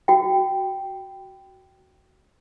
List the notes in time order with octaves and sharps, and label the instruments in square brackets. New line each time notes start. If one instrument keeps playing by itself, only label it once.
[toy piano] F#4 G5